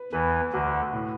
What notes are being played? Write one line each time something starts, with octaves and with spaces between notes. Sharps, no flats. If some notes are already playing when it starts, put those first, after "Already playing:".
Already playing: B4
E2 E3 B4
D2 D3 F#4
A2